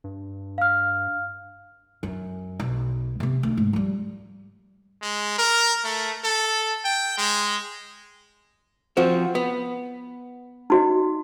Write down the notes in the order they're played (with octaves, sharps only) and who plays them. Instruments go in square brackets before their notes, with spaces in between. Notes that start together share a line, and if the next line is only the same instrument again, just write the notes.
[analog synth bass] G2
[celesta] F5 F6
[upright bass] F#2
B1
C3 B3
D2
G#2
F3 G3
[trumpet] G#3
A#4
A3
A4
G5
G#3
[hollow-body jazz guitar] F3 C4 F#4
B3
[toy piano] D#4 F#4 D#5